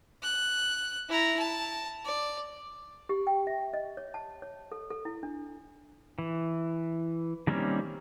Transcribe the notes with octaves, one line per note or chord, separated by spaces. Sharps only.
F#6
E4 A#5
A5
D5
G4
G5
E5
D#5
C#5
A5
C#5
A4
A4
E4
D4
E3
D#3 G3 A#3 C4 C#4